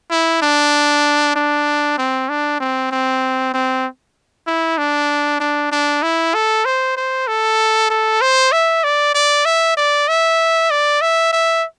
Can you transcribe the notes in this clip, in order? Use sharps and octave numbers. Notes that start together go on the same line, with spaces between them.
E4
D4
D4
C4
D4
C4
C4
C4
E4
D4
D4
D4
E4
A4
C5
C5
A4
A4
C5
E5
D5
D5
E5
D5
E5
D5
E5
E5